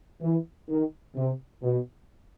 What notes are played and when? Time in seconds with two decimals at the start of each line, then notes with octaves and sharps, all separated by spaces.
0.22 E3
0.69 D#3
1.15 C3
1.63 B2